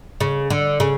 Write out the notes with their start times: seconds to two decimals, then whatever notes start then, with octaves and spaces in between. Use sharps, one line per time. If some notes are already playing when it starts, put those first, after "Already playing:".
0.20 C#3
0.50 D3
0.80 C#3